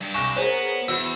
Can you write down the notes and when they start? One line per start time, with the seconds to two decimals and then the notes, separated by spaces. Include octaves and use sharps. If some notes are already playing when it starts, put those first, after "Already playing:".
0.01 G2 G4
0.14 C2 G#5 C#6 F#6 A#6 E7
0.36 B3 G#4 A#4 C5 C#5
0.88 E2 F#4 B4 E6 C7